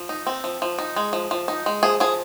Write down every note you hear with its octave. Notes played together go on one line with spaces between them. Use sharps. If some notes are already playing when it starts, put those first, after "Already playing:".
Already playing: F3
D#4
C4
F3
F3
D#4
G#3
F3
F3
D#4
G#3
F3 G#4
F3 G#4